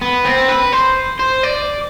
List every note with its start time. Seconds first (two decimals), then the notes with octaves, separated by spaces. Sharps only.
0.01 B3
0.25 C4
0.48 B4
0.72 C5
1.20 C5
1.44 D5